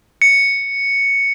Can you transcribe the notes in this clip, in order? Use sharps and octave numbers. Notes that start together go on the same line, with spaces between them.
C#7